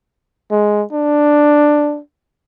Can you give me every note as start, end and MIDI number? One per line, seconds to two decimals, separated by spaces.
0.51 0.83 56
0.92 2.00 62